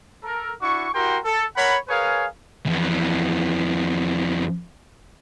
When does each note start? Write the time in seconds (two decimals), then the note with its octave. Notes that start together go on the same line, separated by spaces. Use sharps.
0.23 A4 A#4
0.60 D4 E4 F#4 C#6
0.93 E4 F#4 G4 A#4 G5 C6
1.25 A4
1.57 A#4 C#5 F#5 B5
1.88 G#4 A#4 B4 C#5 F5 G#5
2.66 F2 E3